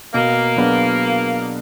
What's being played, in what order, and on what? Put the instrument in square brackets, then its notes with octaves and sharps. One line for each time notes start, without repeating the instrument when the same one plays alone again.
[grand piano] B2 [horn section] A#3
[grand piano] F#3 B3 D4 G#4